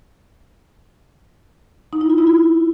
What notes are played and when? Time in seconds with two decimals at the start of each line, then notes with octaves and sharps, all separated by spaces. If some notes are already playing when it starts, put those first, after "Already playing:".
1.93 D#4
2.01 E4
2.10 F4
2.18 E4
2.27 F4